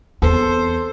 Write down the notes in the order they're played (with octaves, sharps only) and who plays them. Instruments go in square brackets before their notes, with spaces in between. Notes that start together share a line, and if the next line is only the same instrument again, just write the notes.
[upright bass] E2 [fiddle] C4 C5 [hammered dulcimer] A4